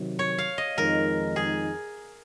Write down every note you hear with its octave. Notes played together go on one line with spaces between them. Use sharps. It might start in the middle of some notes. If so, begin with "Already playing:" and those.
Already playing: C3 D#3 F#3
C#5
F5
D#5
F2 D#3 G#3 D#4 A#4
G#4